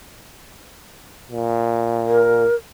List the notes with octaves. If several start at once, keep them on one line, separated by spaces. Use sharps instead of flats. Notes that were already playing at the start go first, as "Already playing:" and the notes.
A#2
A#4